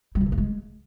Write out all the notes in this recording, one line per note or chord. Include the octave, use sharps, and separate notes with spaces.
G3
A#2
C3
A#3
G#3